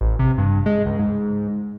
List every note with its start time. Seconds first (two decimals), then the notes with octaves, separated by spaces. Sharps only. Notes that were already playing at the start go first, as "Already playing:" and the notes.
0.01 A1
0.19 C3
0.38 G2
0.66 G#3
0.86 C#2
0.99 G#2